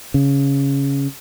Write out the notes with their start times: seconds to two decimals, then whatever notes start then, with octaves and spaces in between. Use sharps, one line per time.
0.14 C#3